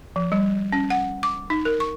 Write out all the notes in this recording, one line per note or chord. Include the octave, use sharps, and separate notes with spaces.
F3
G3
C#4
F#5
D6
D#4
A#4
C#6